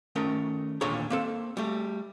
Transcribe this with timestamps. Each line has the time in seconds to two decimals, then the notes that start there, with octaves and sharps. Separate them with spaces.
0.15 D#3 A3 C#4 A#4
0.81 D#2 A#2 D3 A4 C#5 A#5
1.10 A#3 C4 A4
1.57 G3 A3